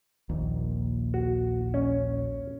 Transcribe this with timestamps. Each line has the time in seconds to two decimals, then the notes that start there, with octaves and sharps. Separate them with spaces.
0.29 A#1 D#2 A#2
1.14 F#4
1.74 C#4